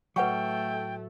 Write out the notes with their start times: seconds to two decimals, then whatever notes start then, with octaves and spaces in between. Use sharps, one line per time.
0.16 A2 F#3 A3 B4 F#5 G5 C#6